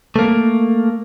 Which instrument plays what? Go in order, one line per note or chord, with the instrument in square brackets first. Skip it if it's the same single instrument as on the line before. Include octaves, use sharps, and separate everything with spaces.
[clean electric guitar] A3 A#3